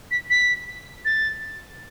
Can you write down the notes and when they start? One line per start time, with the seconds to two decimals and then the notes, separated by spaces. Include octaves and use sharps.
0.11 B6
0.30 B6
1.05 A6